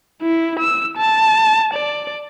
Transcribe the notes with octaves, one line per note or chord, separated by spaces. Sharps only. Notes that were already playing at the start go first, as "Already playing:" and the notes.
E4
E6
A5
D5